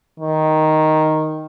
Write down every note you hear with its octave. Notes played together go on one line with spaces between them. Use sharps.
D#3